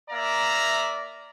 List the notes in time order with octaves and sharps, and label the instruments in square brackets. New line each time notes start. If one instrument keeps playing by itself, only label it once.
[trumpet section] A#3 D5 E5 A#5